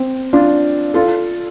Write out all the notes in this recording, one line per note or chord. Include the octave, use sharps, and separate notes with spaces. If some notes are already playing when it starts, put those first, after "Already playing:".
Already playing: C4
D4 F4
F4 A4